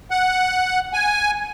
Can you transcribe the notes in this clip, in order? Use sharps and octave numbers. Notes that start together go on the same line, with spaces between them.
F#5
G#5